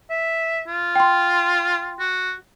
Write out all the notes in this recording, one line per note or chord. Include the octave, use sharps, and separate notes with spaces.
E5
F4
G5 C6
F#4